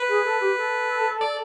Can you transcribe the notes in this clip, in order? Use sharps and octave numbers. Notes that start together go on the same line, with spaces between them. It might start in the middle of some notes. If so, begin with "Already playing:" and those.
Already playing: B4
G#4
A4
G4
A4
D5